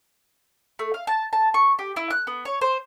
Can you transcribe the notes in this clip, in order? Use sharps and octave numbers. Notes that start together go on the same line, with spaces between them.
A3
F5
A5
A5
C#6
G4
E4
F#6
B3
C#5
C5